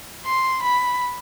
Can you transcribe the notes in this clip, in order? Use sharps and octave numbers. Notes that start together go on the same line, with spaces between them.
C6
B5